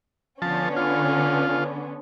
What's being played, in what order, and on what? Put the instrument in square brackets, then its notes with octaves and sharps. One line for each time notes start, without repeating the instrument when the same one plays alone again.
[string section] D3 B3 C#4 [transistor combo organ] F3 A5
[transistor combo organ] F4